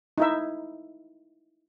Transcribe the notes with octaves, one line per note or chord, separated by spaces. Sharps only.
D#4 E4 E5